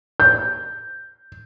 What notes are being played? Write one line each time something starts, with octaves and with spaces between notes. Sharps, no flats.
G6